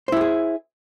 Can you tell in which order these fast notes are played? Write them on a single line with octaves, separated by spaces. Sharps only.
C5 E4 G4 G#4